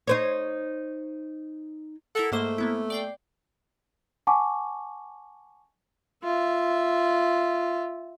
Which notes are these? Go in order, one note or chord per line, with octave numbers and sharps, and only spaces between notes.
D#4 C5 C#5
E4 A4 A#4 F#5
G#2 A3 A#3 C5
A#3 B3 E4
D5 G5 C7
F#5 G#5 A5 C#6 D6
F4 E5